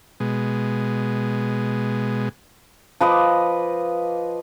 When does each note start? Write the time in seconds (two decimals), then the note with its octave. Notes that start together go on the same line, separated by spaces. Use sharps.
0.20 B2 G#3
3.01 F3 B4 D#5 D6